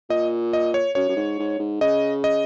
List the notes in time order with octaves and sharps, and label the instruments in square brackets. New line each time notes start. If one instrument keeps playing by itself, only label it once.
[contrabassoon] A#2 [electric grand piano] D#5
[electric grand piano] D#5
C#5
[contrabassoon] F#2 [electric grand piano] C#5
[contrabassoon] F#2
G#2
G#2
G#2
[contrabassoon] C#3 [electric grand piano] D#5
[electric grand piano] D#5